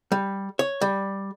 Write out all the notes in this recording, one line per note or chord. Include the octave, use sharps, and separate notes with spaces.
G3
C#5
G3